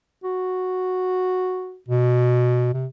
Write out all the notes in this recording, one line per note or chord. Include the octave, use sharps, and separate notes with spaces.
F#4
B2
C3